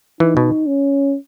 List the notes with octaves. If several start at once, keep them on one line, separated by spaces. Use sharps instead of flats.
E3 D#4
B2
C#4